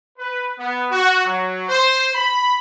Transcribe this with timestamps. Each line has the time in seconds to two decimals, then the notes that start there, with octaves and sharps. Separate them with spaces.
0.18 B4
0.57 B3
0.90 F#4
1.24 F#3
1.68 C5
2.14 B5